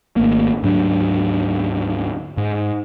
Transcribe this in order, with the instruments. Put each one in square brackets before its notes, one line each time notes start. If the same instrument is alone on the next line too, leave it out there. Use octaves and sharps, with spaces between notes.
[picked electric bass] G#1 A3 A#3
D2 G#2 F#3 D4
G#2